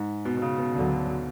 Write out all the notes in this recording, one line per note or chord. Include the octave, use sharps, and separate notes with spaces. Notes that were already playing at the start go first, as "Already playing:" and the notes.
Already playing: G#2
B2
B2
C#3
B2
D2 D3 F#3